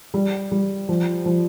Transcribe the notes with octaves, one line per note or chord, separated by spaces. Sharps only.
G3
G3
F3
F3